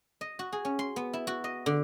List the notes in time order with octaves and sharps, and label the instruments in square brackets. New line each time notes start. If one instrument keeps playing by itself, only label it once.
[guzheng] D#5
F#4
G#4
C#4
C6
B3
E4
F#4
D#5
D3